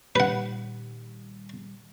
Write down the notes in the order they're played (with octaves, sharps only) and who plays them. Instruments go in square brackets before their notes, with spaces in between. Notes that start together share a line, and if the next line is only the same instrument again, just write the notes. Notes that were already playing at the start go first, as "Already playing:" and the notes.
[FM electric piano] A#2 D#3 G3 [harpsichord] B4 F#5